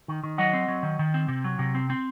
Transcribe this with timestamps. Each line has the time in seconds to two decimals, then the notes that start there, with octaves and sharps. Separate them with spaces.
0.08 D#3
0.23 D#3
0.38 F#3 D#5 F#5
0.53 C4
0.68 F#3
0.83 D#3
0.99 D#3
1.14 C4
1.28 C3
1.44 F#3
1.59 C3
1.75 C4
1.90 C4